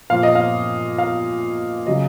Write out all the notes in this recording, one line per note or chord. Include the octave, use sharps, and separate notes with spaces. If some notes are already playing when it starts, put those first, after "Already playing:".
A#2 F3 F5
D#5
F5
F5
C#3 F#3 D#5